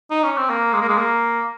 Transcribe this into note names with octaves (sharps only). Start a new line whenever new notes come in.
D#4
C#4
C4
A#3
G#3
A#3
G#3
A#3